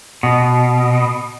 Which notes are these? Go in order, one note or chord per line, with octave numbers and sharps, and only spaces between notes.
B2